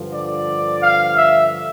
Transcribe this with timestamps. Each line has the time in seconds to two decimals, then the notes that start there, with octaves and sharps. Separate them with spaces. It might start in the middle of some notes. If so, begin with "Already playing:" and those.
Already playing: G2 D3 F3
0.13 D5
0.81 F5
1.15 E5